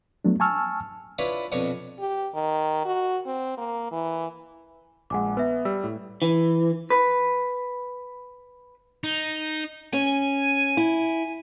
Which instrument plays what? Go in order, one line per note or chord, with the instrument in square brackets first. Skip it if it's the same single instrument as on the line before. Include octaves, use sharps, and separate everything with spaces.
[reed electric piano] F#3 A3 B3 D4
G#5 A5 C#6 E6 F6
[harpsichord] D4 E4 F4 B4 C#5
F2 B2 D4 C#5 C#6
[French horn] G4
D#3
F#4
C4
A#3
E3
[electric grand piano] A#1 G#3 [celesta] F#5 G#5 D6
[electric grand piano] B3 [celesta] B4 E5
[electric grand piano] G3 [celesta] E6
[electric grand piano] A2
[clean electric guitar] E3
B4
[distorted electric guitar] D#4
[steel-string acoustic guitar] C#4 [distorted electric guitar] G#5
[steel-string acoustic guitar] E4